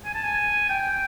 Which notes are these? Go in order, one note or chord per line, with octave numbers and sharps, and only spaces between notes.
G#5
A5
G#5
G5